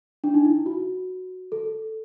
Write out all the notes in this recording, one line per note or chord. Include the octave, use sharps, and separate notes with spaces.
D4
D#4
E4
F#4
A4